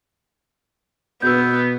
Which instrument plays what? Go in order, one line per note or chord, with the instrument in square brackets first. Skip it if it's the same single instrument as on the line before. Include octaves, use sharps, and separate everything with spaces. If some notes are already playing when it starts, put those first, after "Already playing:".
[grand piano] B2 G#4 B4 [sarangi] B3 [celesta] E6 G6